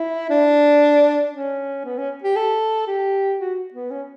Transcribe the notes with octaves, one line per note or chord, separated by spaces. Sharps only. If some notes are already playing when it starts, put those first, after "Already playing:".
Already playing: E4
D4
C#4
B3
C#4
G4
A4
G4
F#4
B3
C#4